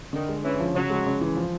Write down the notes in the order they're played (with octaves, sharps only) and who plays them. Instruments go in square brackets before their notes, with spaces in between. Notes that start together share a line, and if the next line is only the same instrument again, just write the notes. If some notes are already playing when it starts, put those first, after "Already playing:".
[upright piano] D3 [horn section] D#3
[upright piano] G#3
[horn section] E3 [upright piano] C#4
[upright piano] F3
[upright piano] C#3 [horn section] F#3
[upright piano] G#3
C#3
E3
F3